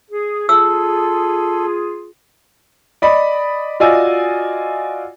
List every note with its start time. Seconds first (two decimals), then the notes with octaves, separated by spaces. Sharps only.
0.11 G#4
0.49 F4 G#4 A4 E6
3.02 D5 D#5 B5
3.80 F4 F#4 D5 D#5 G#5 E6